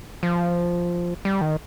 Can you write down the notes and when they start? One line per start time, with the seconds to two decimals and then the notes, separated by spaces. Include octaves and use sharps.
0.23 F3
1.25 G3
1.41 D#3